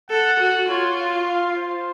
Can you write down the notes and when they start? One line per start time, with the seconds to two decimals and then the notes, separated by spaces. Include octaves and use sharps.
0.10 A4 F#5
0.39 F#4
0.69 F4 C#5
0.98 F5
1.27 F5
1.57 C5